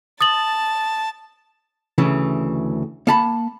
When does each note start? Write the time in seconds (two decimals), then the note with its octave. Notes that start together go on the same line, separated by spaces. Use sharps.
0.21 A5 D#6 A6 F#7
1.98 D2 C#3 E3
3.07 A#3 A5 B5